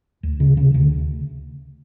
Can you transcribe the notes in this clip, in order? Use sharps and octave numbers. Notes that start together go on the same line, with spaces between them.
D2
C#3
C#3
D2